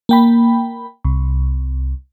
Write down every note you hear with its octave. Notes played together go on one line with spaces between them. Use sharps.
A#3 G5 B5
C2